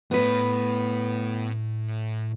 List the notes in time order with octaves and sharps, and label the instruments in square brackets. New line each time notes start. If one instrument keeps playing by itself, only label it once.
[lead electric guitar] A2 A3 [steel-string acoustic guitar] B3 B4